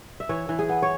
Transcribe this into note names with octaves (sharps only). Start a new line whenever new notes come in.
E5
E3 C#5
E3
G#4
B3
C#5